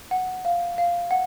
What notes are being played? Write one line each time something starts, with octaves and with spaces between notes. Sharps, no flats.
F#5
F5
F5
F#5